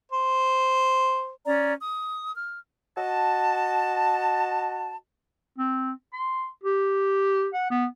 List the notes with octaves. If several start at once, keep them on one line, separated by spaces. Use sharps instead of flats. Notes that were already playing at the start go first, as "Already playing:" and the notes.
C5
C#4 D5 A#5
D#6
F6
F#4 D#5 A5
C4
C6
G4
F#5
B3